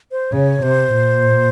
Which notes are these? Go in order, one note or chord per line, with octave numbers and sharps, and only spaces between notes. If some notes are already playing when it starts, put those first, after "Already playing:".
C5
C#3 C#5
C3 C5
A#2